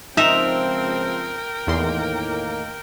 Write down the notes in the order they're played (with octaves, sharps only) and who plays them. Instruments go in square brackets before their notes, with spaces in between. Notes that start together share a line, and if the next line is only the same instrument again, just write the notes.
[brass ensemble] C#2 F3 C4 [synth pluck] D#4 [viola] A#4 G5 [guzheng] E5 A#5
[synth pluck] E2 C6 [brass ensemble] A2 D#3 A#3